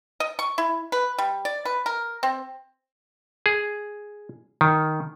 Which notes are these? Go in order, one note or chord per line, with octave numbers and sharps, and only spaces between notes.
D#5
C#6
E4
B4
G3
D5
B4
A#4
C4
G#4
D#3